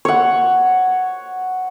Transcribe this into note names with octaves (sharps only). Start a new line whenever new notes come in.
C#5 F#5